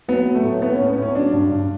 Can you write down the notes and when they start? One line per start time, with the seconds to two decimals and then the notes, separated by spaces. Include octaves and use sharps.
0.08 F#3 B3
0.26 F#3
0.35 A3
0.43 A2
0.62 A2 B3
0.75 C#4
0.80 A2
0.88 B3
0.97 A2 C#4
1.15 F#3 D4
1.33 G2
1.52 G2